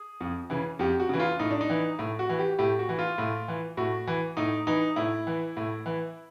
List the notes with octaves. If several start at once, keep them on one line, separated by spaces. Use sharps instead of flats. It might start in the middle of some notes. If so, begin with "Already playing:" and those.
Already playing: G#4
F2
C#3 E3
F2 G4
F#4
C#3 E3
F4
A2 D#4
D4
D#4
E3
A2
F#4
E3
G4
A2 G4
F#4
E3
F4
A2
E3
A2 F#4
E3
A2 D#4
E3 D#4
A2 E4
E3
A2
E3